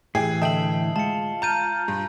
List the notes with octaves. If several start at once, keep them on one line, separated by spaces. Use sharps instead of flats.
A2 E3 G4 G#4 C7
D3 D#5 E5 G5 A5 F#7
G#3 F4 A5 C#7
A5 A#5 F6 G6 D#7
G2